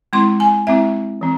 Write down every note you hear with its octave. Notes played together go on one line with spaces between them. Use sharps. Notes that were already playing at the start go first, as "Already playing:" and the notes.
G#3 C4 E4 C6
G#5
G#3 C4 E4 E5
E3 C4